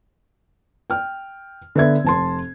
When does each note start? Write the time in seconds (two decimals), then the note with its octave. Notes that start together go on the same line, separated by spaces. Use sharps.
0.90 G5 F6
1.75 D3 B3 E5 G#6
2.04 F1 A5 C6